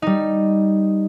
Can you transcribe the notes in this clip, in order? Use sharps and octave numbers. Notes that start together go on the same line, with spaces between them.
G3 D#4